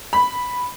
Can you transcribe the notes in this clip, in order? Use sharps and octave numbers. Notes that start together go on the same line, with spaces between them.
B5